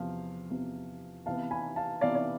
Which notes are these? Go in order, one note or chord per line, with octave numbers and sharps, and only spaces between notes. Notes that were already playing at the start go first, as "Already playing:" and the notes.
Already playing: E2 C3 F3 F5
E2 C3 F3
C3 E3 B3 F5 A5
G#5 B5
F5 A5
C3 E3 B3 D5 F5
D5